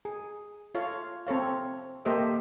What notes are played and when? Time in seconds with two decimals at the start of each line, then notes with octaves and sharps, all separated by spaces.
0.05 G#4
0.75 F4 A4 C#5 F5
1.27 C4 A4 C#5 F5
2.05 A#3 G4 A4 C5 D#5 E5